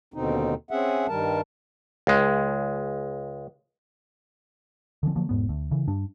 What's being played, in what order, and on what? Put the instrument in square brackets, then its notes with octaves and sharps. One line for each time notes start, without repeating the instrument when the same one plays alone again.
[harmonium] D#2 B2 D3 C4 D#4
C4 C#4 G#4 E5 F#5
G2 D#3 G3 A#4 A5
[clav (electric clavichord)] C#2 G#3
[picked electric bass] D3 E3 F3 C4
D3 F3 F#3 A#3
E1 G#2 B3
D2
C#3 E3
G2 G3 D4